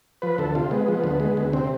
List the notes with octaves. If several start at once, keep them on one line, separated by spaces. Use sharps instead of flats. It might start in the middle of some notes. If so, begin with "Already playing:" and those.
F3 B4
D2 A4
C3 F4
G#3 B3
F3
D2
G#3
D2
C3 C4